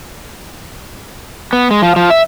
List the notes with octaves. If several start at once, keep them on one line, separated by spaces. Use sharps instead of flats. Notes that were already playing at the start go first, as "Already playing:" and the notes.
B3
G#3
F3
F3
E5